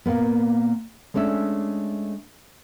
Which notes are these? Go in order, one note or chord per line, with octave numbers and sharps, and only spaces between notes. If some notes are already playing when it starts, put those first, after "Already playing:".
A#2 A#3 B3
G#3 A3 C#4 D4 E5